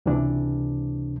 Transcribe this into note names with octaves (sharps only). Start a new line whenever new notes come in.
C#2 C3 E3 D4